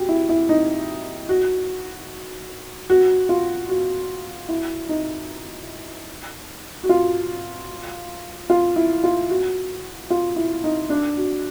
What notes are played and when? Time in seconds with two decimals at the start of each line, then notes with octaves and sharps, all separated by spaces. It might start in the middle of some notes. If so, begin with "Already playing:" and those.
Already playing: F#4 G4
0.09 E4
0.29 E4
0.49 D#4
1.29 F#4
2.90 F#4
3.29 F4
3.69 F#4
4.49 E4
4.89 D#4
6.84 F#4
6.89 F4
8.50 F4
8.76 E4
9.04 F4
9.30 F#4
10.10 F4
10.36 E4
10.64 D#4
10.89 D4
11.17 F#4